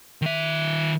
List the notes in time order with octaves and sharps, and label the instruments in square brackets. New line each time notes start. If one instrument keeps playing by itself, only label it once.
[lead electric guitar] D#3 E5